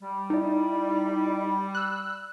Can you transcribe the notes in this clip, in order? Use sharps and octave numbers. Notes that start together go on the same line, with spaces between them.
G3
D#4 E4 D5
E6 F#6